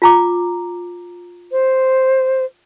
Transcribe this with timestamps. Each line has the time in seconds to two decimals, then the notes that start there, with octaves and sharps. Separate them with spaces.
0.02 F4 A#5 D6
1.52 C5